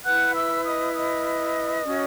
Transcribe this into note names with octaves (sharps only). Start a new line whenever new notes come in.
E4 B4 F#5 F#6
E5 E6
D#5 D#6
D#5 D#6
C#4 F#4 C#5